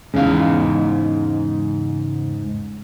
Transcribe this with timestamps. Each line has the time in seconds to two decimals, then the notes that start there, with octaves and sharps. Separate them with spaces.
0.14 E2 G#2 C#3 F5